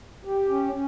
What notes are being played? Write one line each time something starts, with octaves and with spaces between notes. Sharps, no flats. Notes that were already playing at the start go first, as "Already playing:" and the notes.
G4
C#4
C#4